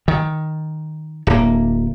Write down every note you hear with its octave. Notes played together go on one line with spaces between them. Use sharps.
D#3
D1 A#3